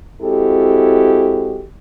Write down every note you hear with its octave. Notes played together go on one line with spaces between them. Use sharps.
G#3 C4 E4 F#4 G4 A4